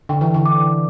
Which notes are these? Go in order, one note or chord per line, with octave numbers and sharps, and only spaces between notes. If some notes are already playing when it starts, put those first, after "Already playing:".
D3 G5
E3
D3
D6